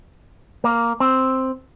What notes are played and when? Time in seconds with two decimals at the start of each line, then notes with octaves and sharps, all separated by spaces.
0.64 A#3
1.00 C4